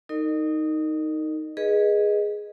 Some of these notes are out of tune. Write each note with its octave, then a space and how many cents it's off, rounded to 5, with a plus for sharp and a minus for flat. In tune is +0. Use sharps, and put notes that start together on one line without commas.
D#4 +5 A#4 -35 D#5 -40
G#4 +0 B4 -20 D#5 +0